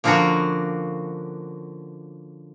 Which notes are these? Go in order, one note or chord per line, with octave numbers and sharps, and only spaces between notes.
D3 F3 A#3 C#4 F#4 A#4